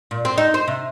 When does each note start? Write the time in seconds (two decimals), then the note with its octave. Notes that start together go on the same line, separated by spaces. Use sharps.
0.11 A#2
0.25 C4
0.38 D#4
0.54 C5
0.68 C3